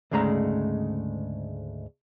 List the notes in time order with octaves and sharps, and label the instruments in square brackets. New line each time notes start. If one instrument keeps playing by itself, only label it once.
[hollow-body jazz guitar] D2 G#2 C#3 G#3 A3 A#5